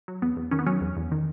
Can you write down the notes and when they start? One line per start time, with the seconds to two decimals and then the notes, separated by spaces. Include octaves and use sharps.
0.08 F#3
0.22 E2 B3
0.37 E2
0.51 D#3 C#4
0.59 B3
0.66 F#3 C#4
0.81 E2
0.96 E2
1.12 D#3